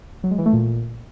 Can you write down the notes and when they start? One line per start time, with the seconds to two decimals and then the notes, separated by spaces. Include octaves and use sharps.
0.24 F#3
0.31 G#3
0.38 E3
0.46 A3
0.53 A#2